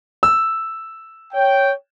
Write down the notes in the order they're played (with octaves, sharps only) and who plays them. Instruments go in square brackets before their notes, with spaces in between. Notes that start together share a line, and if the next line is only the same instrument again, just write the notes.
[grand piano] E6
[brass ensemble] C#5 G5